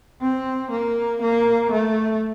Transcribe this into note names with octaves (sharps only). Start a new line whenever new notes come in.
C4
A#3
A#3
A3